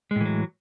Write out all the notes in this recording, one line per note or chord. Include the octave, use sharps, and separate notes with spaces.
A2 E3 F#3 G#3